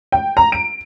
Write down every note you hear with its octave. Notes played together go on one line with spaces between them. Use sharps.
G5
A#5
D7